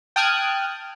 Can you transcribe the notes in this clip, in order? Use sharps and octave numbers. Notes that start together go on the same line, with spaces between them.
G5 A5 D#6 F6 F#6 G#6